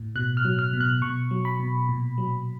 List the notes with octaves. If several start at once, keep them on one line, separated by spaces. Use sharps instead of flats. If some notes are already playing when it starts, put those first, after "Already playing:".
Already playing: A2
B2 F#6
F6
F#3
F6
B2
F#6
B2 C#6
F#3
B5
B2
A#2
F#3